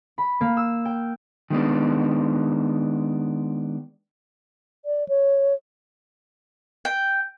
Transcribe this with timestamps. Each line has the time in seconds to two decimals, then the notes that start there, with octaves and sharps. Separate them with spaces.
0.18 B5
0.41 A#3
0.57 E6
0.85 G5
1.50 D#3 G#3 B3 D4
4.85 D5
5.09 C#5
6.85 G5